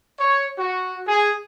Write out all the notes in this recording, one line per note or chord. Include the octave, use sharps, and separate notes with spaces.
C#5
F#4
G#4